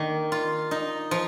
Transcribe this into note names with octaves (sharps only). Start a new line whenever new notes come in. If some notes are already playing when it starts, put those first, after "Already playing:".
Already playing: D#3 A#3
F4
D#4
F3